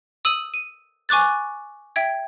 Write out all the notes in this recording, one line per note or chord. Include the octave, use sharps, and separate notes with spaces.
D#6 E6 D#7 F#7
D#7
G#5 C#6 D6 F#6 A6
E5 G5 G#6